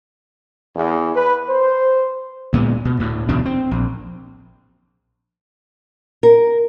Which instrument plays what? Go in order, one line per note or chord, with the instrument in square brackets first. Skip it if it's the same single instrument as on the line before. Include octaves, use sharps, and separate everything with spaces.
[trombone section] E2
B4
C5
[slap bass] D2 A#2 G#3 B3
B2
D2 A2
E2 B2 D3 D4
C4
A#1
[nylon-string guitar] A#4